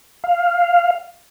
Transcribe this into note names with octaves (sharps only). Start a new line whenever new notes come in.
F5